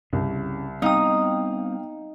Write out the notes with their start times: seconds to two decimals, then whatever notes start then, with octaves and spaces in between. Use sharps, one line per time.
0.13 C2 C#3
0.82 G3 B3 C4 D#4 F5 G5 D#6